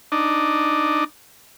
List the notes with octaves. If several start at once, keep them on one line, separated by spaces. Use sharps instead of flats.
D4 D#4